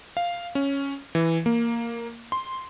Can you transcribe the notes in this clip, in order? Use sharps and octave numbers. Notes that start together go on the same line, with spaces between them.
F5
C#4
E3
A#3
C6